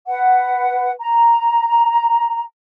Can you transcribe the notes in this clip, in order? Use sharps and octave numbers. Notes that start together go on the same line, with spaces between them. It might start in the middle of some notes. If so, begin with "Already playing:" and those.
B4 F#5
A#5